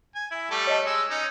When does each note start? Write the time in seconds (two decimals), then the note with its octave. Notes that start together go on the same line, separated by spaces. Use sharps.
0.15 G#5
0.31 E4
0.51 G3 A3 A4
0.67 C#5 D#5 A5
0.86 G#3 E6
1.10 C#4 D#4